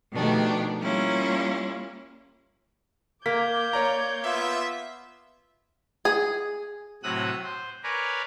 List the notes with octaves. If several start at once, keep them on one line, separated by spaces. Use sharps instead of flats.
B2 D#3 F3 A3 D4 G4
G3 A#3 C#4 E4 F4
A#3 D6 G6 G#6 B6
C#5 D5 A#5
B3 F4 E5
G#4
A2 C3 F#3 D#6 E6 F#6
C5
A#4 B4 C#5 D5 G#5 A#5